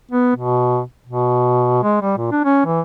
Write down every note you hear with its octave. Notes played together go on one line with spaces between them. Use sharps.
B3
B2
B2
G#3
G3
A#2
D4
C#4
E3